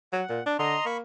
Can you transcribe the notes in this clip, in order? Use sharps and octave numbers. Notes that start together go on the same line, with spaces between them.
F#3 F#5
A#2
D4
D3 D#5 A#5 C6
A#3 B5 C#6